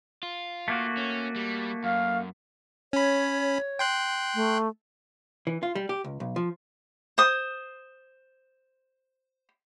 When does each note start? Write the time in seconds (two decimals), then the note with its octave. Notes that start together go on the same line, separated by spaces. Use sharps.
0.23 F4
0.68 A3 A#3 F#4
0.97 C#4
1.36 G3
1.84 F#2 F5
2.93 C#4 C#5 B5
3.79 G5 C6 F#6
4.35 A3
5.47 E3
5.63 F4
5.75 G3
5.89 G4
6.04 C#2
6.20 B1
6.36 F3
7.18 C5 D#6